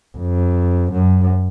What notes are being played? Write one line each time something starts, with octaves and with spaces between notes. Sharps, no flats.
F2
F#2